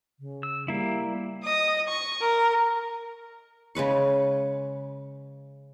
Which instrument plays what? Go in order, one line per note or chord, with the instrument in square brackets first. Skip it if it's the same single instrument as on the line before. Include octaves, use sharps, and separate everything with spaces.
[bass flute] C#3
[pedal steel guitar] E6
[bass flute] G3 [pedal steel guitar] A#3 E4
[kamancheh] D#5 D#6
C#6
A#4
[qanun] C#3 G#3 B4 C#6